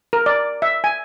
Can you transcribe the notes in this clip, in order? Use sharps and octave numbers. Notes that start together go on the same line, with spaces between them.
A#4
D5
E5
G#5